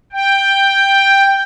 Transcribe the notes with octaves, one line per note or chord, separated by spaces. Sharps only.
G5